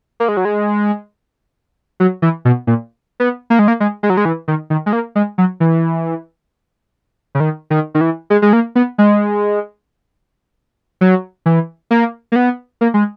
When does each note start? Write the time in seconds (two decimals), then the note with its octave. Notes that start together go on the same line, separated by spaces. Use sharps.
0.20 A#3
0.28 G#3
0.37 F#3
0.45 G#3
2.00 F#3
2.22 E3
2.45 B2
2.67 A#2
3.20 B3
3.50 A#3
3.59 G#3
3.68 A#3
3.80 G#3
4.03 G#3
4.10 F#3
4.17 G#3
4.25 E3
4.48 D#3
4.70 D#3
4.86 G#3
4.93 A#3
5.15 G#3
5.38 F#3
5.60 E3
7.35 C#3
7.40 D#3
7.70 D#3
7.95 D#3
8.01 E3
8.30 G#3
8.42 G#3
8.53 A#3
8.75 B3
8.98 G#3
11.01 F#3
11.46 E3
11.91 A#3
12.32 A#3
12.36 B3
12.81 A#3
12.94 G#3